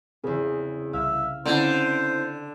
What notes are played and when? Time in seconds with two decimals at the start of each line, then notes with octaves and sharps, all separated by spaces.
0.24 E2 C#3 C4 G#4
0.93 C2 E5 F5
1.46 D3 C4 C#4 E4 C5